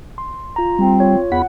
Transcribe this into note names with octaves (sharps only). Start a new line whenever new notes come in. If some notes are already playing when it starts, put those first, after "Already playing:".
C6
F4 A#5
G3 C4
F4 C#5
E2 F4 F#5 B5